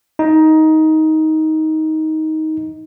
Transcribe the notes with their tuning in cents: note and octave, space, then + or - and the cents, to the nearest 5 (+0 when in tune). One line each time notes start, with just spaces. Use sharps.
D#4 +15